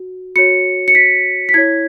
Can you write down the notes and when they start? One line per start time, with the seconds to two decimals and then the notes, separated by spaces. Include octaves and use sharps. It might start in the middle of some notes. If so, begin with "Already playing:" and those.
Already playing: F#4
0.36 F#4 C#5 C#7
0.88 C#7
0.95 B6
1.49 B6
1.54 E4 C#5 G#6